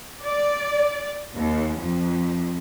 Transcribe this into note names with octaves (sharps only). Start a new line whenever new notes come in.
D5
D#2
F2